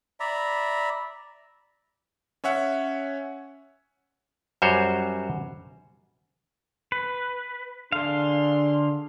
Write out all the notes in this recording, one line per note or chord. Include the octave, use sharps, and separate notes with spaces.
D5 E5 A#5 B5
C#4 C#5 E5 F#5
F#2 G3 F#4 C5 C#5
B4
D3 D4 G#4 A4 F5 C6